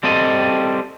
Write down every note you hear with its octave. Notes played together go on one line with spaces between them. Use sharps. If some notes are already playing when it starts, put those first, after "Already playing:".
G3 C4 A4 D#5